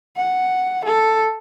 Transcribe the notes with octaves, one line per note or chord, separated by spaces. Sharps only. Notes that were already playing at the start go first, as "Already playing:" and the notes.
F#5
A4